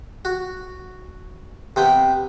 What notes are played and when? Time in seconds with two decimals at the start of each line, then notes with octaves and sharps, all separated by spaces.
0.25 F#4
1.76 C3 B3 G5